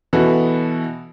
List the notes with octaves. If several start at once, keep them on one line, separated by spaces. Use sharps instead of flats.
B2 E3 B3 F#4 A4